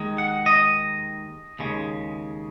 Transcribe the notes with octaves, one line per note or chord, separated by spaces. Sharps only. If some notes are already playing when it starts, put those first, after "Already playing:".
Already playing: D#2 D#3 G#3
F#5
D#5
D#2 C#3 G#3